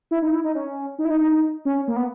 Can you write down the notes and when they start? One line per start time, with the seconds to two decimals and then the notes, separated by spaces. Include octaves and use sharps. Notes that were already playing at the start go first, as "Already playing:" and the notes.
0.11 E4
0.22 D#4
0.32 E4
0.44 D#4
0.55 C#4
0.99 D#4
1.05 E4
1.10 D#4
1.21 D#4
1.32 D#4
1.65 C#4
1.88 A#3
1.96 B3